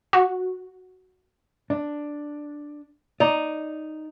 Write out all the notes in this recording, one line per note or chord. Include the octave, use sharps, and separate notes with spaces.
F#4
D4
D#4 D5